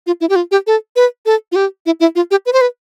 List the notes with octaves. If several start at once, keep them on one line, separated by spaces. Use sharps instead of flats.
F4
E4
G4
F4
G4
A4
B4
A4
F4
G4
E4
E4
F4
G4
B4
C5
B4